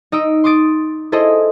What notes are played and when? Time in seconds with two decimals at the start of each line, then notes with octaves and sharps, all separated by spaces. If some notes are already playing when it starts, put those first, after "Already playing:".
0.12 D#4 D#5 E6 D7
0.44 C6 D6 D#6 A6 D7
1.12 E4 G#4 A4 C5 D#5